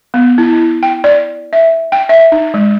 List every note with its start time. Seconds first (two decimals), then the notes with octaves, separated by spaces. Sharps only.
0.14 B3
0.38 E4
0.53 E4
0.83 G5
1.04 D5
1.53 E5
1.92 G5
2.09 E5
2.32 D#4
2.54 G#3